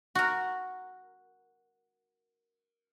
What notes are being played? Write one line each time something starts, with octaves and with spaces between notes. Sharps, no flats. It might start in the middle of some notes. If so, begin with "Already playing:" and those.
F#4 A#4